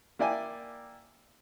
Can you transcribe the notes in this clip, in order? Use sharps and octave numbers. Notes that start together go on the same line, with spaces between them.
A#3 E4 D5 G5 G#5